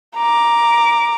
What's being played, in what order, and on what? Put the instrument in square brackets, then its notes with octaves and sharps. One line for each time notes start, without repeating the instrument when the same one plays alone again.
[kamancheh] A#5 D6